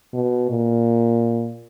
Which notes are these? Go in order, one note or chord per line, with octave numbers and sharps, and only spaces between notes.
B2
A#2